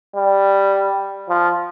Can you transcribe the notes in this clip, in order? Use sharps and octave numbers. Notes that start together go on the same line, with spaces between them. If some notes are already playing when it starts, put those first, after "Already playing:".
G3
F3